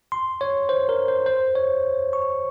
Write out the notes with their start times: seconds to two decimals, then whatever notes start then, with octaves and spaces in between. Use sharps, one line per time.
0.12 C6
0.41 C#5
0.69 C5
0.89 A#4
1.08 C5
1.26 C5
1.55 C#5
2.13 C#6